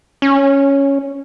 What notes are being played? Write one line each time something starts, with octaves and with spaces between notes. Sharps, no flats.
C#4